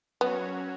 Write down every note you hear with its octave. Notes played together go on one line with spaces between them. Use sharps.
F#3 B3 C#4 F#4 C#5